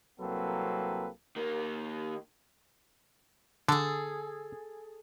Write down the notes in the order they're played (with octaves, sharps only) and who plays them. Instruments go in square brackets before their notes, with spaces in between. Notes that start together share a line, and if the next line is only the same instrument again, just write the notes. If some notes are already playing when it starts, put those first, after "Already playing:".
[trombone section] C2 F#3 A#3 C4 A4 B4
[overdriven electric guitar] D#3 A#3
[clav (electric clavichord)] D3 [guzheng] G#4 A4